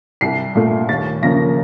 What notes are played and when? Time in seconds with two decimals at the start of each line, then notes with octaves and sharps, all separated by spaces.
0.21 C2 C7
0.55 A#2 A3
0.89 D#2 A6
1.22 C#3 F3 A#3 A#6